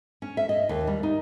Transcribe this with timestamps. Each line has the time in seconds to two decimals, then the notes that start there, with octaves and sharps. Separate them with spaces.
0.22 C#4
0.37 E5
0.49 D#5
0.69 D#2
0.87 G3
1.03 D#4